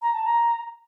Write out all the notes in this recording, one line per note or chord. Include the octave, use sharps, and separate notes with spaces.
A#5
A5
A#5